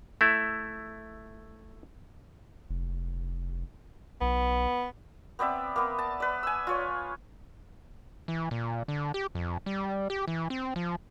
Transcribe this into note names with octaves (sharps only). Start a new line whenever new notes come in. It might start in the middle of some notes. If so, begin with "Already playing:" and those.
A3 E4
F1
B1 B3
B3 C4 D5 E5
A#3 B3
A5
B4 D5
G#5 E6
F4 C#5
E3
A#2
D3
G4
F2
G3
G4
E3
C4
F3